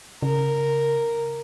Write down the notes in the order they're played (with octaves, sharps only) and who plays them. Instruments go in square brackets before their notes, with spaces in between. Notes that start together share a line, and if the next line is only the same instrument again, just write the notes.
[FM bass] C#3 [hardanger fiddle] A#4